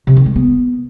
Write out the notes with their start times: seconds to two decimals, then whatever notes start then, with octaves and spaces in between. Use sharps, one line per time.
0.07 C3
0.17 D#3
0.26 G#3
0.36 B3